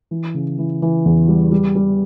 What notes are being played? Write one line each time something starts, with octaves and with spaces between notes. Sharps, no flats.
E3
C#3
E3
E3
E2
G3
G3
G3